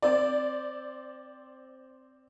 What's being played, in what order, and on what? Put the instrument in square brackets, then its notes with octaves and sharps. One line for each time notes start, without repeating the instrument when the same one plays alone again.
[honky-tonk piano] C4 D5